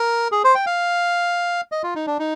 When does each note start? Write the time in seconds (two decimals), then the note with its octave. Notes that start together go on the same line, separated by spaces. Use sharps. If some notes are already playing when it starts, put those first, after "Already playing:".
Already playing: A#4
0.32 G#4
0.44 C5
0.55 G5
0.66 F5
1.72 D#5
1.83 F4
1.95 D#4
2.07 D4
2.19 D#4